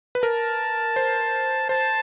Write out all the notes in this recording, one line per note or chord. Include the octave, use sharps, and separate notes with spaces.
B4
A#4 A5
C5
C5 A5